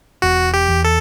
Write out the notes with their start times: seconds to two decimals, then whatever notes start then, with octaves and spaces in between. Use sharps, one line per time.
0.22 E1 F#4
0.54 G4
0.68 E2
0.85 A4